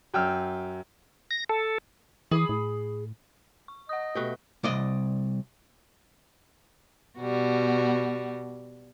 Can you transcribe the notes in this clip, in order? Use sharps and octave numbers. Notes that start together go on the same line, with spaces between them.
F#2 G5 E6 F6
A#6
A4
E3 G#4 B5 D#6
A2
C#6
D#5 F#5 D#6
B2 A3 G4 G5 F#6
C2 D5 D#5
B2 G3 F#4